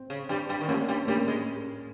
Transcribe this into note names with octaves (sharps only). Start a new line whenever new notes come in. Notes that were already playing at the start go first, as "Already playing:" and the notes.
Already playing: C4
C#3
G2 G3
G2 G3
D#3
F2 F3 A#3 C#4
G2 G3
G2 G3 A#3 C#4
G#3